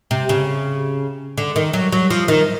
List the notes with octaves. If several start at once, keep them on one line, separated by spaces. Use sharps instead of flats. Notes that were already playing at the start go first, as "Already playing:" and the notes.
C3
C#3
D3
D#3
F#3
F#3
F3
D#3